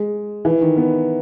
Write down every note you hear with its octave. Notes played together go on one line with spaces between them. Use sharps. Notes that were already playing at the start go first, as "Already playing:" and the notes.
Already playing: G#3
E3
D#3
B3